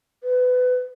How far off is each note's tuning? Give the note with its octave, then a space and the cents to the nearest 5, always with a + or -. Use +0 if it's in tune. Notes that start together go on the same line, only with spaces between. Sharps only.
B4 +25